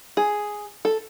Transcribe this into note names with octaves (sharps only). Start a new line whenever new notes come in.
G#4
A4